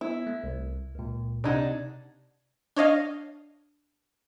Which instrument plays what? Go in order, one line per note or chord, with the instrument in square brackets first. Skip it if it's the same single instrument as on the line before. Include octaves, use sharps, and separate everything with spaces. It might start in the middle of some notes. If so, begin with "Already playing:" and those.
[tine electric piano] B3 [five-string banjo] E4
[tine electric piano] A3
C2
C#2 A#2
[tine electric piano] C3 D#5 G#6 [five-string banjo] D4 D#4 F#5
[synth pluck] D4 C#5 D#5 F5